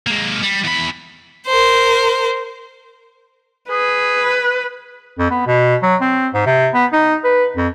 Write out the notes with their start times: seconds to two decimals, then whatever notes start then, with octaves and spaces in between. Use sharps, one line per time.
0.07 G#3 A#3
0.42 G3
0.64 E2 B5
1.47 A#4 C5
3.71 G#4 B4
5.19 F2
5.30 B3
5.47 B2
5.83 F#3
6.01 C4
6.34 G#2
6.46 C3
6.74 B3
6.93 D#4
7.24 B4
7.56 F2